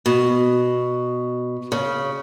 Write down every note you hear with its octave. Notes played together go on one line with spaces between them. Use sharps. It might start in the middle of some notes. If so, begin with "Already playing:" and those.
B2
C#3